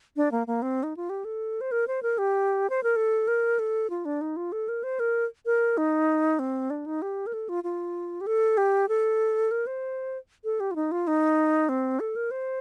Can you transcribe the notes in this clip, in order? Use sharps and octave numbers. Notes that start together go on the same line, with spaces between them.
D4
A#3
A#3
C4
D#4
F4
G4
A4
C5
A#4
C5
A#4
G4
C5
A#4
A4
A#4
A4
F4
D4
D#4
F4
A4
A#4
C5
A#4
A#4
D#4
C4
D4
D#4
G4
A#4
A4
F4
F4
G4
A4
G4
A4
A#4
C5
A4
G4
F4
D#4
F4
D#4
C4
A4
A#4
C5